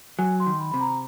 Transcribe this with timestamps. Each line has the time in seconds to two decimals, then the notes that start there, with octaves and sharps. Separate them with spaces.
0.19 F#3 G#5
0.40 C6
0.46 D#3
0.60 B5
0.72 C3 B5
0.81 A#5